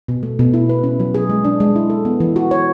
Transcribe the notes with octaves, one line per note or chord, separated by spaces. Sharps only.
B2
A3
B2
E4
B4
C#4
F#3
G#4
G#3
D4
G#3
E4
A4
B3
E3
F#4
C#5